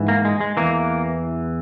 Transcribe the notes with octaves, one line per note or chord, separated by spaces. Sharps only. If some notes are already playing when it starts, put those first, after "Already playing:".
Already playing: G#2 E3
A#3
G#3
G#3
E2 E3 A#3